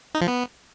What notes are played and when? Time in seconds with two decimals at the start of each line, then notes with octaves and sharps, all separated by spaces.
0.15 D#4
0.21 F3
0.28 B3